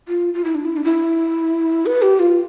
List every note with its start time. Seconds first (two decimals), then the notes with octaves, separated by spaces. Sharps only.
0.08 F4
0.34 F4
0.44 E4
0.55 D4
0.65 E4
0.77 D4
0.84 E4
1.86 B4
2.02 G4
2.20 F4